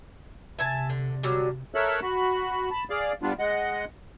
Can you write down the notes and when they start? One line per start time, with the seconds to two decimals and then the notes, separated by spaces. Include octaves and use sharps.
0.59 C3 E5 G#5 A5
0.89 D3
1.23 D3 F#3 G3
1.75 A4 A#4 C#5 E5 A5 F#6
2.02 F#4 B5
2.71 A5 B5
2.90 G#4 D5 F5
3.22 G3 B3 D4 F4
3.39 G#3 D#5 F#5